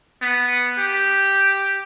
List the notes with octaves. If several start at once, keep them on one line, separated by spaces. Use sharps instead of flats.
B3
G4